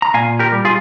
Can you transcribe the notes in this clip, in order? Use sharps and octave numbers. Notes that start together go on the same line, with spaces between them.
A#5
A#2 F5 G#5
G4 A#4
G3
F4 G#4